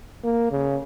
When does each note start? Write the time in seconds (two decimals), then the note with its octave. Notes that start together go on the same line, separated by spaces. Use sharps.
0.24 A#3
0.51 C#3